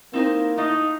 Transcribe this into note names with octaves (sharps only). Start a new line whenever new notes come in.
A#3 C4 D#4 E4 C5
A3 D#4 D#5 F5